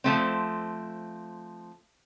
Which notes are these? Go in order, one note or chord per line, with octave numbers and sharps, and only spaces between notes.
F3 F#3 A3 C4